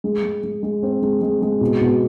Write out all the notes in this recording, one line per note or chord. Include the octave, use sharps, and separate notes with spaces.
G#3
G#3
G#3
G#3
C4
G#3
G#3
G#3
B2
B2